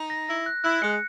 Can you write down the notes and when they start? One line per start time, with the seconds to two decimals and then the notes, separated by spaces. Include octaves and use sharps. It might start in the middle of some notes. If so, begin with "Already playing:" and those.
Already playing: D#4
0.10 A#6
0.28 E4 A#6
0.46 F#6
0.64 E4 F#6
0.82 G#3 C#7